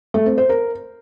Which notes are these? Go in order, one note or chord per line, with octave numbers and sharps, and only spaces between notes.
A3
C4
C5
A#4